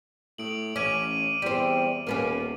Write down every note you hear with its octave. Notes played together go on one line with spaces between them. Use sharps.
A2 D#6 D7 F#7
A1 C#4 D6 F6 D#7
E2 G3 C4
D#1 A#3 B3 C#4